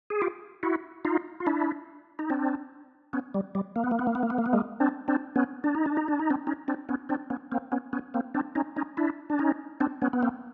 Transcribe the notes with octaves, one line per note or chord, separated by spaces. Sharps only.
G#4
F4 G4
E4 F#4
D#4 F4
F4
D4 E4
D#4
C4 D4
B3 C#4
G3
G3
A#3
B3
A#3
B3
A#3
B3
A#3
B3
A#3
B3
G#3 A#3
C4 D4
C4 D4
B3 C#4
D4
D#4
D4
D#4
D4
D#4
C4 D4
C#4 D#4
C4 D4
B3 C#4
C4 D4
B3 C#4
A#3 C4
B3 C#4
B3 C#4
A#3 C4
C4 D4
C#4 D#4
C#4 D#4
D4 E4
D4
C#4 D#4
C4 D4
B3 C#4
B3
A#3 C4